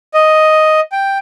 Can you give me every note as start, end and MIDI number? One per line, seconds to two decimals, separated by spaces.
0.14 0.80 75
0.92 1.18 79